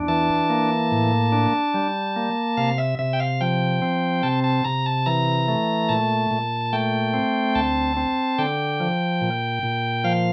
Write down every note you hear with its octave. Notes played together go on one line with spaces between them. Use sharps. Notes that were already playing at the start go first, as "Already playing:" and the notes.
Already playing: E2 D4
E3 A5
A#3
A2
D4
G3
A#3
C3 F5
E5
C3 E5
G5
F5
F3 G5
C4
C3 A5
A5
C3 A#5
A5
E3 A#5
A3
A#2 A5
A#2
A3 G5
C4
D2 A5
C4
D3 G5
F3
A#2
A#2
F3 F5